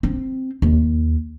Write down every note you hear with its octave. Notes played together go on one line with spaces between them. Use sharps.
C4
D#2